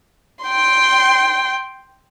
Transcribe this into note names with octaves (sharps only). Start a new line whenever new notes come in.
G5 C6